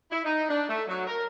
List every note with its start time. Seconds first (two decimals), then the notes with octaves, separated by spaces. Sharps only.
0.10 E4
0.25 D#4
0.49 D4
0.68 A3
0.87 F#3
1.07 A#4